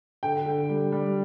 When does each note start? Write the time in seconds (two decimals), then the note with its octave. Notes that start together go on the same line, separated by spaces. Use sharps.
0.23 D3 G5
0.46 D3
0.69 G3
0.92 G3